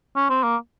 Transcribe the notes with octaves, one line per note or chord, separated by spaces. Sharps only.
C#4
C4
A#3